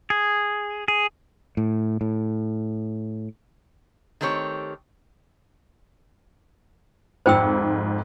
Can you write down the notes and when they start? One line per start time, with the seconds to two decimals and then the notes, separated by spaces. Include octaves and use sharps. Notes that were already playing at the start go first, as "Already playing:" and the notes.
0.10 G#4
0.88 G#4
1.57 A2
2.01 A2
4.21 D#3 A3 C4 G4 C#5
7.26 G#1 F2 G#2 C5 G5 E6